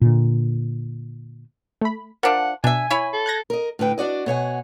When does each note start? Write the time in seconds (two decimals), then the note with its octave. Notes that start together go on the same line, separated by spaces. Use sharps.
0.01 A#2 D3
1.81 A3 B5
2.23 F3 D4 A#4 F5 F#5
2.64 B2 D4 E5 G#5
2.90 E4 C#5 B5
3.13 A4
3.26 F#6 G#6 A#6
3.50 A#4 D#5
3.79 A2 D3 B4 G5
3.98 D4 F#4 D5 D#5
4.26 B2 C#5 F#5 G#5